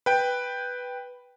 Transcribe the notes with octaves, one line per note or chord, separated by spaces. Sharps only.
B4 G5